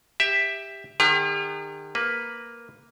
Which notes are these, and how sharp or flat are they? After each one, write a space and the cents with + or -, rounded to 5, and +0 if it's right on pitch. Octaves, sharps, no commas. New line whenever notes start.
G4 +15 E5 +0
D#3 -35 G4 +45
A#3 +0 B4 +0